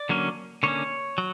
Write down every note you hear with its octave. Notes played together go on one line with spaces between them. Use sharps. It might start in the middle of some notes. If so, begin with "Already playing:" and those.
Already playing: D5
D3 F#3 A#3 C#4
D3 A#3 C#4 C#5
F#3